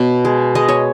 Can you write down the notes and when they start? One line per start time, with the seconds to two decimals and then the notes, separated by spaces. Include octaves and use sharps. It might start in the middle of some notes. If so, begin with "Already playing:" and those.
Already playing: B2 C#5
0.25 G#3
0.55 G#3 D#5
0.69 C#5